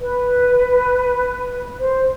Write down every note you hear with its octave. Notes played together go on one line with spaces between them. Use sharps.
B4
C5